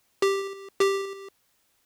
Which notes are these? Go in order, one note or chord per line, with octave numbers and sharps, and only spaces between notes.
G4
G4